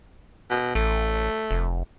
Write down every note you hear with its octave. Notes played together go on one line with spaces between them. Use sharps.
B2
A1 A3
F1